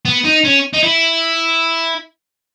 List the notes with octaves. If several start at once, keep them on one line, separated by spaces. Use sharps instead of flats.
B3
D#4
C#4
D#4
E4